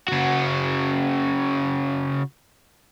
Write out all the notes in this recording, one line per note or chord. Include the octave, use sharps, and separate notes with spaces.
C#3 F#4